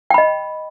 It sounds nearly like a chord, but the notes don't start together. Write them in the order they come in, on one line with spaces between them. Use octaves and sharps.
G5 B5 D#5